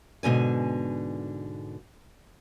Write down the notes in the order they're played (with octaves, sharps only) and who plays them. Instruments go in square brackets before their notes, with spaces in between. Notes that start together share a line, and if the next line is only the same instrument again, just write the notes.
[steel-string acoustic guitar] G#2 B2 D3 G#5